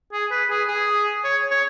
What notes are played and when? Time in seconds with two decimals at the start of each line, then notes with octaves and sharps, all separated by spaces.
0.13 G#4
0.31 B4
0.50 G#4
0.69 G#4
1.24 C#5
1.51 C#5